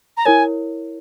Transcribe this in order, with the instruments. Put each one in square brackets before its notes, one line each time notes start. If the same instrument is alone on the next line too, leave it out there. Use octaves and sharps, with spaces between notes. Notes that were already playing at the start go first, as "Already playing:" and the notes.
[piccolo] A#5
[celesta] E4 A#4 C#5 [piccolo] G#5